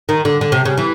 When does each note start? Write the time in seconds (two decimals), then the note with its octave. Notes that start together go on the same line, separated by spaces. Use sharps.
0.09 D#3
0.25 D3
0.41 D3
0.52 C3
0.65 C#3
0.77 E3